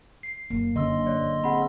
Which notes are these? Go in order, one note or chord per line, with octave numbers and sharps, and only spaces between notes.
C7
F#1 A#3
F#1 D3 C#4 D#5 C6 E6
C#5 D5
F#1
C4 G#4 F#5 B5